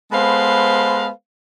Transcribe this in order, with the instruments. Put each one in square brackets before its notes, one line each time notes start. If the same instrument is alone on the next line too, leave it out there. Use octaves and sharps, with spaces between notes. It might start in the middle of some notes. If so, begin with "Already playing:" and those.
[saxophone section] G#3 B3 A4 B4 C5 F5